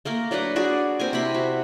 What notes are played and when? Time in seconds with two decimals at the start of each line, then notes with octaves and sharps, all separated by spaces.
0.05 A3 A#3 A#4
0.31 F#3 D4 B4 F#5
0.56 D4 F#4 G#4
0.99 C4 A#4 G#5
1.13 C3 E4 B5
1.34 F#4